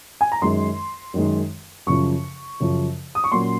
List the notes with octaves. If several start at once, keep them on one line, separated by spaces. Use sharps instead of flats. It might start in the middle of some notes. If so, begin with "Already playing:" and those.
G#5
A#5
F#2 D#3 G#3 C6
F#2 D#3 G#3
F#2 C#3 F3 C#6
F#2 C#3 F3
D#6
C#6
A#2 F#3 A#3 C#4 C6